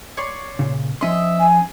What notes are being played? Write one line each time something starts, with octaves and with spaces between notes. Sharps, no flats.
C#5 D5 C6
A#2 C#3
F3 C#4 D#5 E5 C6
G#5